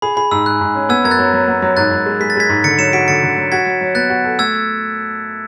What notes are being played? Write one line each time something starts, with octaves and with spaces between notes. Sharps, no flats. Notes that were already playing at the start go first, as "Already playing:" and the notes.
G#4 B5
G#4 B5
G#2 E6
G#2 F#6
G#2
C#4
B3 E6 G#6
F#2 G#6
F#6 A6
F#3
F#3
B3
F#3
G#2 F#6 A6
G#2
G#3
G#3 B6
A6
G#3 G#6 B6
G#2
D3 A6 C#7
F#3 C#7 E7
F#4 B6 D7
D3 A6 C#7
D3
F#3
F#4 G#6 B6
F#3
F#3
B3 F#6 A6
F#4
A4
A3 E6 G#6